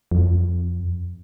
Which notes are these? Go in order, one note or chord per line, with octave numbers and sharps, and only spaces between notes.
F2